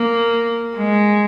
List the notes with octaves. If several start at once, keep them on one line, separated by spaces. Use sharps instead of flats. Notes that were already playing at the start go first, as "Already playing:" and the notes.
Already playing: A#3
G#3